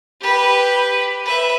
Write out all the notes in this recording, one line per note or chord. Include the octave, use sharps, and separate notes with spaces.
G4 B4
B4 E5